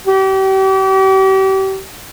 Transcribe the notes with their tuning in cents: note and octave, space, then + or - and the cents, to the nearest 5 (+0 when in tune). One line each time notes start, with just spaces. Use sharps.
G4 -35